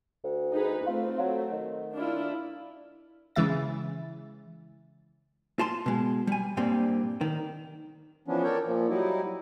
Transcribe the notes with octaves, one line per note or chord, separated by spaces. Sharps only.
D2
D#4 G#4 B4
A3 C4 F4
F#3
D#3
D4 E4 F4
C#3 E3 G#3 E5 A6
F4 A5 C6
B2 G#3
G3 G#5
G2 A#2 G3 C4
D#3
E3 F3 B3 C#4 D4
A4 A#4 C#5 D5 G5
A#2 F3
F#3 G3 D#4 E4